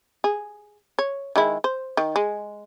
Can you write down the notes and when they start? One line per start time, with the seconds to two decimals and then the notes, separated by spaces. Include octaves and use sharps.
0.24 G#4
0.99 C#5
1.36 D#3 G#3 E4
1.64 C5
1.97 D#3
2.16 G#3